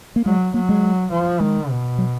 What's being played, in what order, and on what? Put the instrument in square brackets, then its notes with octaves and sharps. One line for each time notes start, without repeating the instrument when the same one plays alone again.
[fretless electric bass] A#3
[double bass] F#3 [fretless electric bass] G#3
[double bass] F#3 [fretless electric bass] A#3
[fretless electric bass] G#3
[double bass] F3
[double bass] D#3 [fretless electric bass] G#3
[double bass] B2
[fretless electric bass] F#3